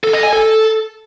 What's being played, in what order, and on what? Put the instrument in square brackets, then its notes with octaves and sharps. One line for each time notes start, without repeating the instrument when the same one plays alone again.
[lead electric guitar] A4
D#5
G#5
A4